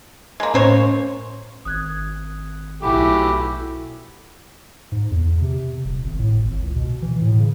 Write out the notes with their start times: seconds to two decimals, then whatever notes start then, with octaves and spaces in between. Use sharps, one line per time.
0.40 G#3 A#3
0.54 A2 A#3 C#4 C5 C#5
1.65 G#1 D#6 F#6 G#6
2.82 B1 A3 E4 F#4 G4 G#5 B5 D6
4.92 G#2
5.11 E2
5.42 C3
5.85 D#1
6.03 G#1
6.19 A2
6.44 G#1
6.61 C#2
6.76 B2
7.02 E3
7.21 A2
7.40 C#3